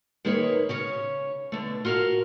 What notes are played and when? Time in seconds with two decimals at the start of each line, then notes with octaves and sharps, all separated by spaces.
0.25 D#3 G#3 A#3 G#4 B4 C#5
0.69 C#3 C#4 C#5
1.52 B2 D3 A3
1.85 F4 F#4 A#4 D5 F5